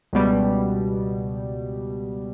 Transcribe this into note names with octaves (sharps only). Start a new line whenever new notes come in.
C#2 B2 G3